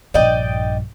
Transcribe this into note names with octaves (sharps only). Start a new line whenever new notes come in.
A#1 G2 D5 D#5 G5